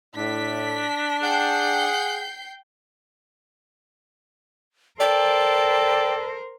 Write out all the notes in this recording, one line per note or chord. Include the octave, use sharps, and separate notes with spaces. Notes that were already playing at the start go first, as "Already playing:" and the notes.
A2 D4 B6
G#4 F#5 G5 G6 C7
A4 A#4 C5 D5 G5